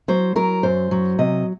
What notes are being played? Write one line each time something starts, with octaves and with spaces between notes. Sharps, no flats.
F#3 C5
F#3 A#4
F#2 C5
F#3
C3 D#5